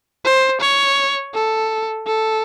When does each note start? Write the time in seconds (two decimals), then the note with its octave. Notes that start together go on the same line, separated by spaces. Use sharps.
0.24 C5
0.61 C#5
1.34 A4
2.07 A4